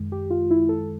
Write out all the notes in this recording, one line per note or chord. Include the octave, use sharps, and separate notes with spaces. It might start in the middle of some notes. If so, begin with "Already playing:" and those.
Already playing: F#2 D#3 G#3
G4
F4
E4
A4